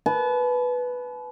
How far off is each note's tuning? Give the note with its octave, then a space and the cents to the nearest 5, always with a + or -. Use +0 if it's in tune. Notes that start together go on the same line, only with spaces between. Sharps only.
B4 +0 A5 -40